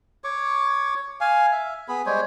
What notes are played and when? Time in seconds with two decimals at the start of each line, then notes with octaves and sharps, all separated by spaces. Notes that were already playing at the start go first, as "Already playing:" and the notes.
0.24 C#5 C#6 D6
1.21 F5 G#5
1.52 E5
1.88 B3 G#4 B5
2.06 G3 G#3 C5 C#5